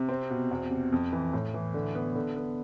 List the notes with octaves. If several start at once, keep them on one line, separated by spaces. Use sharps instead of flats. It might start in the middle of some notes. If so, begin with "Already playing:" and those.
Already playing: C3
C4
B2
E2
C3
F2
E3
A2
E3
D3
B3
D3
B3